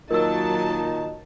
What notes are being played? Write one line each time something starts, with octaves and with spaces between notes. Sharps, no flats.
A#2 D#3 F#3 D#4 A#4 A5 E6